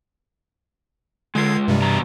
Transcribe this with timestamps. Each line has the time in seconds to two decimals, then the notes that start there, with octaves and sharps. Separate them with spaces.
1.35 D3 G#3 F4 G#6 C7
1.68 G2 C3 G3
1.82 E2 B2 A#5